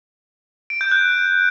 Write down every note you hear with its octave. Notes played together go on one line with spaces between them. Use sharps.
D7
G6
F#6